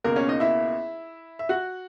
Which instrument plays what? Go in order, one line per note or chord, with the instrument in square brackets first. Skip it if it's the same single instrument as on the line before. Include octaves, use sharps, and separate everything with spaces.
[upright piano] C#2 B2 A#3 A#4
C#4 C#5
D#4 D#5
E4 E5
E5
F#4 F#5